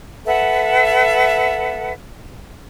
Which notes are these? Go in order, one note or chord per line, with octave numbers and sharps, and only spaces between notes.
A4 B4 E5 F#5